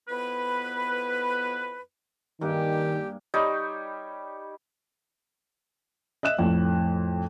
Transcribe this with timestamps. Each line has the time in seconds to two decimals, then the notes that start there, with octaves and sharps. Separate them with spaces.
0.09 F2 B3 E4 B4
2.41 G2 D#3 A#3 G4 G#5
3.34 G3 D#4 G4 C#5
6.23 D#5 E5 F#6 E7
6.39 F2 A2